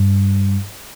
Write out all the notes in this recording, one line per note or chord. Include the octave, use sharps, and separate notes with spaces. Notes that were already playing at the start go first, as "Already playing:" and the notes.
Already playing: G2